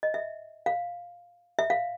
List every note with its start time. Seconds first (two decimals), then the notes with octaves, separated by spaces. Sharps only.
0.03 D#5
0.14 E5
0.66 F5
1.59 E5
1.70 F5